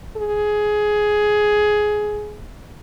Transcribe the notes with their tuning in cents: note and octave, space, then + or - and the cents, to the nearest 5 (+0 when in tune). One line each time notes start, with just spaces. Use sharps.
G#4 +15